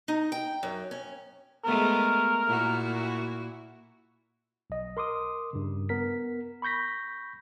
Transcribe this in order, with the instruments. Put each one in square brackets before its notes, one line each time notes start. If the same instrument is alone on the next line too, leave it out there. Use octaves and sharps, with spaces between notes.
[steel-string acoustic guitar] D#4
G5
F#2
C#4
[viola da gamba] G#3 A3 B3 [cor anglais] A#4
[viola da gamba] A#2 E4 F#4
[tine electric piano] B1 D#5
A#4 C6 D6 D#6
G2 C#3
B3 A#4 B6
B5 C#6 G6 A#6 B6